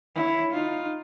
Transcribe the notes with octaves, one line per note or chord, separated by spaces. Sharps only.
E4 C#5
D#4 F4